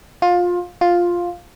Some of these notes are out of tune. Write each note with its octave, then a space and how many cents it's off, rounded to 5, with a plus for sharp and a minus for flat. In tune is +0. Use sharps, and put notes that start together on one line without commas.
F4 +20
F4 +5